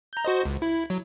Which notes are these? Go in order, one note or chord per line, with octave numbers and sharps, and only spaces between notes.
A#5 G6
F#4 C5 D#5
C#2
E4
F#3